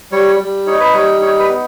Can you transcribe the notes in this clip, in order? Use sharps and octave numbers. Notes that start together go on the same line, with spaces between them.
G3 C#5
G3
D#4 C#5
B4
G3 C#5
D#4 C#5
B4
B3